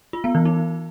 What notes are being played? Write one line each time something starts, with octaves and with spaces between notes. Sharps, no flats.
F4
B3
E3
D#4